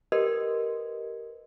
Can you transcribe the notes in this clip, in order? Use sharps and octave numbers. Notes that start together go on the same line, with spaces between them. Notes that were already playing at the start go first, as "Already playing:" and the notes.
G4 A#4 B4 D#5